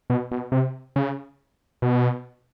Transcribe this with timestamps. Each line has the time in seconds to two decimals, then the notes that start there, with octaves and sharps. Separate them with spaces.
0.10 B2
0.31 B2
0.52 C3
0.96 C#3
1.82 B2